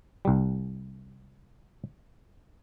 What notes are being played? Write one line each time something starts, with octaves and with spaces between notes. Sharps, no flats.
C2 G3